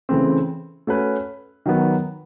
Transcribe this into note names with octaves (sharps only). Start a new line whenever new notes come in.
C#3 E3 A3 C4
A3 C#4 F#4 B4
D#3 F#3 B3